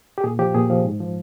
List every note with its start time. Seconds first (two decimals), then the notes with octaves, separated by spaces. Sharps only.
0.18 G4
0.24 A#2 G#4
0.39 F3 G4
0.55 A#2 G#4
0.70 F3
0.85 G#2
1.00 F3